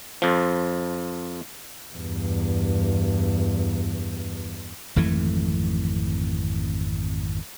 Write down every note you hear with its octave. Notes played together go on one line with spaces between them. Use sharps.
F2 F3
E2 G2
G#1 F2 E3 A3